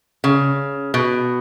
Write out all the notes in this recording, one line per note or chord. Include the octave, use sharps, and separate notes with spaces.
C#3
B2